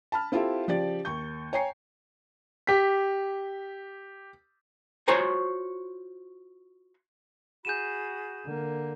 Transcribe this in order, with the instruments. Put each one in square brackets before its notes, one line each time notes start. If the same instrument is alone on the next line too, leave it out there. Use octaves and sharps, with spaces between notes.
[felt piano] A5 B5 F6
C4 E4 F4 G4 A4
C#3 F3 G4 D5 A6
D#2 C#6 G6
C#5 G5 G#5 A#5 C7 C#7
[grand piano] G4 B6
[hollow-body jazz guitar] F4 F#4 C5 C#5 G#5 A#5
[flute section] F#4 G#4 B5 [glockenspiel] G6 D#7 E7
[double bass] D3 A#3